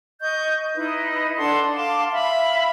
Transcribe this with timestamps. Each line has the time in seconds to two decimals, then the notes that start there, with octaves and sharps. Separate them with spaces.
0.21 D#5 C#6 G6
0.75 D#4 E4 B4 D#5
1.37 D4 A4 F#5 C6
1.74 F5 A5 C6 D6
2.12 E5 F5 B5